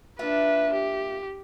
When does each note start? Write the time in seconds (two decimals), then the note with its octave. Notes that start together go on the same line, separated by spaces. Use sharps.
0.19 A#3 D4 F4 B4 E5
0.74 G4